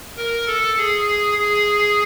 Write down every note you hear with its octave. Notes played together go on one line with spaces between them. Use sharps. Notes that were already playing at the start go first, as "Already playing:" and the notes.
A#4
A4
G#4
G#4